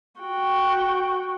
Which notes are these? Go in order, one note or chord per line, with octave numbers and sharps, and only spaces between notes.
F#4 G5